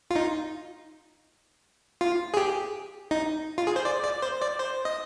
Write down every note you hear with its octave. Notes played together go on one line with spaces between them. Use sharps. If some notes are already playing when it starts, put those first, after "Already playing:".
F4
D#4
F4
G#4
G4
D#4
F4
G#4
C5
D5
D5
C5
D5
C5
D#5